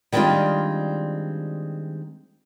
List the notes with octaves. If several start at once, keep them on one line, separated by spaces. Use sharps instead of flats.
D#3 G3 G#3 C4 D4 F4